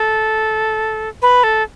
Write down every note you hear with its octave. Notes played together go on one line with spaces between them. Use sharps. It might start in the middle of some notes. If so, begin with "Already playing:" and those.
Already playing: A4
B4
A4